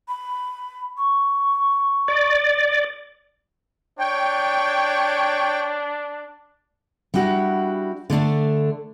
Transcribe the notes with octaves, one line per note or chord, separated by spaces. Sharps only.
B5
C#6
D5
D4 C#5 G5
G3 D4 E4 F#4
D3 A3 D4